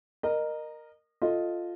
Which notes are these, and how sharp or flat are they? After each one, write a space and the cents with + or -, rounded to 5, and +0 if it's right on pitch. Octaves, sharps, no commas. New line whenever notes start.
A#4 +0 D#5 -25
F4 +0 A4 +0 D#5 +0